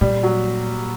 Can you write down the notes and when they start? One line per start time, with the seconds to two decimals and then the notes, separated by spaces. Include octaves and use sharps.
0.01 A#2 G3
0.23 F#3